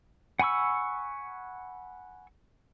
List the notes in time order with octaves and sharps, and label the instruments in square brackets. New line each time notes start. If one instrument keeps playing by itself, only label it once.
[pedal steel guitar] F#5 G#5 B5 C#6 E6